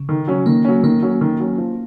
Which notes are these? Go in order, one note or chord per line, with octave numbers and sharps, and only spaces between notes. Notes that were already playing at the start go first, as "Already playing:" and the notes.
Already playing: C#3
D#3
F#3 C#4
D#3 A#3
F#3 C#4
D#3 A#3
F#3 C#4
D#3
F#3 C#4
F3